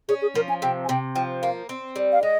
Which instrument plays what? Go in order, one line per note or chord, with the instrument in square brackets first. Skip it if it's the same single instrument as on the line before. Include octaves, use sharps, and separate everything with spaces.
[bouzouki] C#4 [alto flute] G#4
[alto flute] G#4
[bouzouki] F3 [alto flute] A#4
[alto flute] G#5
[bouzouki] C3 [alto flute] G5
[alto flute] G#5
[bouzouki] C3 [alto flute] G5
[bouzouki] F3 [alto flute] G5
[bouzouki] A#3 [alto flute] F5
[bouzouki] C4
G3
[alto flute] F5
[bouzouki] G#3 [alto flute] D#5